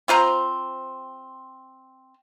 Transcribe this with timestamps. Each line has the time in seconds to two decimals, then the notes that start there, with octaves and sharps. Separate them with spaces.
0.08 C4 F4 C5 A#5